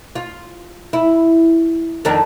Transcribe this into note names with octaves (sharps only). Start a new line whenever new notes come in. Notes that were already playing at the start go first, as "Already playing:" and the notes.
F4
E4
F2 D#3 D4